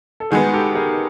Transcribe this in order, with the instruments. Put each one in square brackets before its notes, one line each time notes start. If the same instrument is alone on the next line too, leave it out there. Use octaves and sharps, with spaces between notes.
[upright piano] A4
[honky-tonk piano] D#3 G#3 B3 [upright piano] F#4 G#4
[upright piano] G4 A4
G#4 A#4